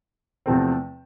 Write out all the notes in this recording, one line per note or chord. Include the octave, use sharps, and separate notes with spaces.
E2 C3 F3 A3 C4